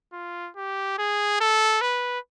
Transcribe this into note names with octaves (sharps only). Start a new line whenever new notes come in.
F4
G4
G#4
A4
B4